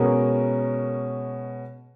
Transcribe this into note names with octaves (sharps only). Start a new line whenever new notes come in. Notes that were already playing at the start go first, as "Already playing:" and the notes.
Already playing: B2 G#3 C#4 A#4